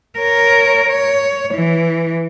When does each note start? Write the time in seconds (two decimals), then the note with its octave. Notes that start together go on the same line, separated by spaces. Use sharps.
0.19 A#4 C#5
0.88 C#5
1.54 E3